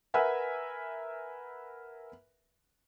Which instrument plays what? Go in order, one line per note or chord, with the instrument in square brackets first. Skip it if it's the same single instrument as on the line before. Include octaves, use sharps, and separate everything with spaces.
[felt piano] A#4 B4 E5 F#5 G#5